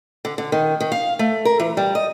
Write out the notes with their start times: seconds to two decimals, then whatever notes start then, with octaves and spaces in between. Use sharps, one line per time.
0.25 D3
0.38 D3
0.52 D#3
0.80 D#3
0.92 F5
1.19 A3
1.45 A#4
1.60 E3
1.77 G3
1.95 D#5